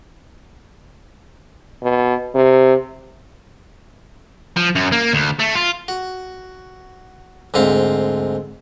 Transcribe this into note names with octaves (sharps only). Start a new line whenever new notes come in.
B2
C3
F3
F#2
A#3
D2
A3
F4
F#4
D2 G#2 C4 F5